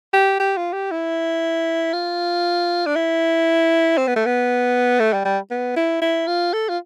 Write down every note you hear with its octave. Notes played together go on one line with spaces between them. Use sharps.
G4
G4
F4
G4
E4
F4
D4
E4
C4
B3
A3
B3
A3
G3
G3
B3
E4
E4
F4
A4
F4